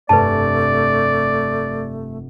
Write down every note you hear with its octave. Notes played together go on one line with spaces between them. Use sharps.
F1 G2 A3 B4 D5 A5